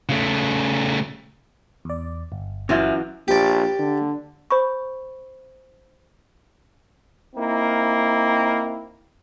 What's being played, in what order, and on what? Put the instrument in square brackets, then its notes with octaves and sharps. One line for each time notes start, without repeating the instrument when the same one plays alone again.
[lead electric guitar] C#3 A3
[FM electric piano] E2 D5
G1
[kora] E3 F#3 F4 [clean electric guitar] C#4 E5
[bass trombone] A#1 [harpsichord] G4 D5
[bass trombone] D3
[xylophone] C5 B5 C#6
[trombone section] A#3 C4 D#4 E4